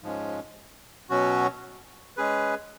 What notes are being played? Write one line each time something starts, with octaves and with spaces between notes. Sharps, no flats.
G#2 F3 G#3 C#4
B2 F#3 C#4 F#4
G#3 C#4 G#4 B4